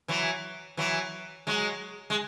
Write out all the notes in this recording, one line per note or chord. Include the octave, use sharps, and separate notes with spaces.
E3 F#3
E3 F#3
F#3 G#3
G#3